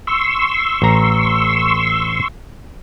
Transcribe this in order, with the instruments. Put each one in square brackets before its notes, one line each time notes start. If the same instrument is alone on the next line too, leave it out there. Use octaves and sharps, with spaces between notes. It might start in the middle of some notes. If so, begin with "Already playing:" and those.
[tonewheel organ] C6 C#6 E6
[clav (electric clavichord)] A1 A#5